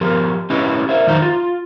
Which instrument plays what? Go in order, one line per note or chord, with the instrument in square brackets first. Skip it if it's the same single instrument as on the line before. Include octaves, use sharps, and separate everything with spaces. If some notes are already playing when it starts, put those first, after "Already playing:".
[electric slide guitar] F3 G4 A#4
C#4 E4 G4 B4 D#5
A#4 C5 E5
F2 D#3 F#3 D#4 C5 A#5
F4